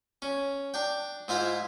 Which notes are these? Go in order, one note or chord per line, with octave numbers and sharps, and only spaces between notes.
C#4
D4 G5
G#2 E4 F4 C5 B5